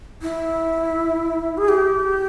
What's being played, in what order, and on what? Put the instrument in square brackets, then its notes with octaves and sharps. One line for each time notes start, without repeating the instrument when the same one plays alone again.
[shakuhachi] E4
G#4
G4